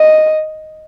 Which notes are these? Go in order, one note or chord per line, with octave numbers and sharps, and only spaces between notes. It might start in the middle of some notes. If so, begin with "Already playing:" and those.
Already playing: D#5